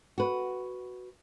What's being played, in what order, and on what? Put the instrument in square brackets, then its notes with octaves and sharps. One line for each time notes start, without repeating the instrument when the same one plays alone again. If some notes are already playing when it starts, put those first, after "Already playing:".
[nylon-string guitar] F#4 B4